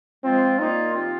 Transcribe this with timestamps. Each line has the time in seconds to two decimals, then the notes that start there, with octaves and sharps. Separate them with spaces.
0.23 F3 G#3 C4 F4
0.59 A#2 A#3 D#4 F4
0.93 C3 F3 C4 F4